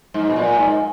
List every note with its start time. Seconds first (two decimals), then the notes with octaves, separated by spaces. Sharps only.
0.14 G#2
0.30 B2
0.36 A#2
0.58 G#2